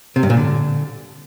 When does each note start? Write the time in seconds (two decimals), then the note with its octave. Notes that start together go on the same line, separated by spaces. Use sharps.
0.16 C3
0.23 G2
0.30 A#2
0.37 D3